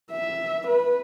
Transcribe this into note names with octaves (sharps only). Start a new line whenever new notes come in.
E5
B4